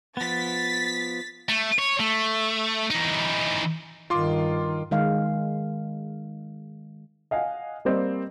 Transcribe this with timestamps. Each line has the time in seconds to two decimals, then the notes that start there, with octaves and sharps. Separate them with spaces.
0.17 F3 B3 A6 B6
1.49 A3
1.78 C#5
2.00 A3
2.91 E3 D#4
4.10 G2 D#3 F4 C6 D6
4.91 D#3 G#3 F5
7.31 D#5 F5 F#5 G#5
7.85 G3 A#3 C4 D5 D#5